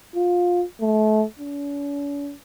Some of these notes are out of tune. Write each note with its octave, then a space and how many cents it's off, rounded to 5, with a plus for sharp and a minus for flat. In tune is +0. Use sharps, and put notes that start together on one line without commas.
F4 +20
A3 -30
C#4 +45